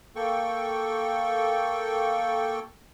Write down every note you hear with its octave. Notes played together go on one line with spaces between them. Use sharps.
A#3 A4 G5 C#6